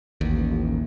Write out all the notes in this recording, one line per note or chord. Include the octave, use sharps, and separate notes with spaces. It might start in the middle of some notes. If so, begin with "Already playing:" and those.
A1 D#2